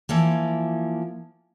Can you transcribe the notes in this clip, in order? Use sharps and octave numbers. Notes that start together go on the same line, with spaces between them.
E3 F3 A#3